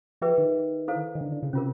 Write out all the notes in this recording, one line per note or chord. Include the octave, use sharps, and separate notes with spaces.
F3 G#4 B4 E5 G5
D#3
E4 A4 C5 F5
D#3
D3
D3
C#3
C3 C#4 F4 A#4